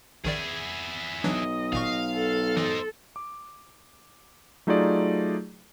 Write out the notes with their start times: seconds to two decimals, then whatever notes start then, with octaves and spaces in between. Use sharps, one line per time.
0.25 A#1 D#3 E4 G#4 D5
1.24 B1 E3 F#3 D4 D#5
1.73 G#1 A#2 F5 C#6
2.15 A4
2.57 E3 D#4 C5
3.16 D6
4.67 F#3 A3 D#4 F4 G#4 D5